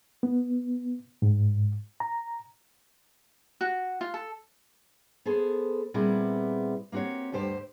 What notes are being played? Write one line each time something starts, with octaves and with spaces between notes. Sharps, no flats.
B3
G#2
A#5
F#4
F4
A4
B3 G#4 A4 C5
A#2 G3 B3 C4 E4 G#4
A#3 C4 F#4 G4 C#5
D2 G2 G4 C5 G5